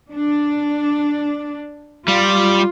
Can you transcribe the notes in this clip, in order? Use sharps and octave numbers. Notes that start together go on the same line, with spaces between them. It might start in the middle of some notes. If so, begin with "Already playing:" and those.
D4
G3 F4